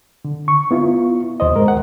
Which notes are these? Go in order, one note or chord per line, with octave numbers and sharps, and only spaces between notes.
D3
C#6
B3 E4 F4
D#2 C5 D#5
G#2 G#3 A#4
F#5